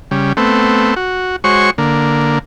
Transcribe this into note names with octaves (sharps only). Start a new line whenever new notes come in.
C#3 G3
A3 B3 C4
F#4
G#3 F#4 C5 C#5 C#6
D3 A#3